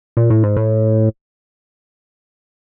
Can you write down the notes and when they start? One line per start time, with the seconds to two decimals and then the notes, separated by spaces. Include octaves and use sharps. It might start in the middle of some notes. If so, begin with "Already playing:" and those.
0.17 A#2
0.30 A2
0.44 G#2
0.57 A2